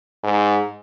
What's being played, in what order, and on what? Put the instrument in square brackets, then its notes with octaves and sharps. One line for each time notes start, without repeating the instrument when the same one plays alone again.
[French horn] G#2